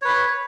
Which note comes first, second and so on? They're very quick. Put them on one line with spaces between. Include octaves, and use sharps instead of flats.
C#5 B4 B5